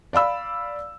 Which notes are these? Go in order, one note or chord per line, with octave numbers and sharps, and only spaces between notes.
D5 F5 B5 E6